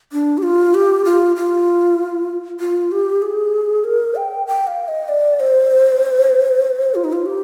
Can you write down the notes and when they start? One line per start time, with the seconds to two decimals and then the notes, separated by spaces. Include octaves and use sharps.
0.12 D4
0.38 G4
0.43 F4
0.74 G4
1.05 F4
1.36 F4
2.60 F4
2.92 G4
3.22 G#4
3.84 A#4
4.15 G5
4.47 G5
4.67 F5
4.88 D#5
5.09 D5
5.40 C5
6.95 F4
7.04 D#4
7.13 F4
7.26 G4